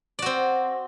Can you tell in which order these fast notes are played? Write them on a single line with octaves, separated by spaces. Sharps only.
D5 F#4 C4